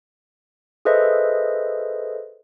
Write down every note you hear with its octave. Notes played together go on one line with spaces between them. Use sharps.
G#4 A4 B4 C5 D#5 E5